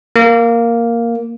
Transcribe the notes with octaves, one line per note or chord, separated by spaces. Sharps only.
A#3